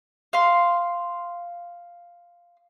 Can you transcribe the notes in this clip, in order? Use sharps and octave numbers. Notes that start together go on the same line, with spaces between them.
F5 C6